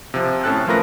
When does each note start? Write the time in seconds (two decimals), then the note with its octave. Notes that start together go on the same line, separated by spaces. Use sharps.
0.14 C3 F3
0.44 A2 C#4 A4 A5 F#6
0.67 F3 A3 F4 A#4 B4 A#6